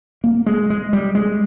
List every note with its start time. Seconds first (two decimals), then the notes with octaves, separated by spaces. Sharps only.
0.24 A#3
0.46 G#3
0.70 G#3
0.93 G3
1.15 G#3